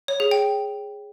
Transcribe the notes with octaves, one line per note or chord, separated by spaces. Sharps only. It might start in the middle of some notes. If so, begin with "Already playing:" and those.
C#5
G#4
G5